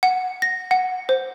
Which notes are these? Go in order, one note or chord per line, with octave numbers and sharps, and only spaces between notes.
F#5
A#6
F#5
C5